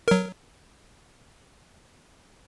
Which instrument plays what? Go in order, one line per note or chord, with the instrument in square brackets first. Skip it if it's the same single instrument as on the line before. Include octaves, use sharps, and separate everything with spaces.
[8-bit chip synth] F#3 A#4